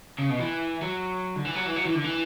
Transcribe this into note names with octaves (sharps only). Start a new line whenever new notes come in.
C#3
B2
E3
F#3
D3
E3
F#3
E3
F#3
E3
D3
E3